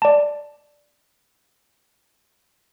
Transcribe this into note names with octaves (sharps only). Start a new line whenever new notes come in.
D5 A5